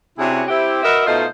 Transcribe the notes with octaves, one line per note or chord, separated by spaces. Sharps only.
C3 C#4 D4 E4 F#4 G#4
C4 E4 G4
F#4 A#4 B4 D#5 E5
B2 A3 D#4 F4 C5 D#5